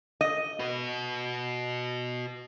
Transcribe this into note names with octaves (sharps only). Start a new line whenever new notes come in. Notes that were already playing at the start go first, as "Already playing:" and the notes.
D#5
F#4 B4